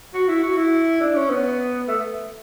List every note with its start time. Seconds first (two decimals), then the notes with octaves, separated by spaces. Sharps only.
0.14 F#4
0.28 E4
0.43 F#4
0.57 E4
1.01 D4
1.15 C#4
1.30 B3
1.88 A3